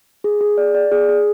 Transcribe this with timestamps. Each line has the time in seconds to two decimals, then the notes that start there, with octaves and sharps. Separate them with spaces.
0.24 G#4
0.41 G#4
0.58 D5
0.74 D5
0.92 G#4
1.09 G#4